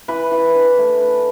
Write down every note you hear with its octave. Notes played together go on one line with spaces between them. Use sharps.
E3 B4
E3
D4
A3
E3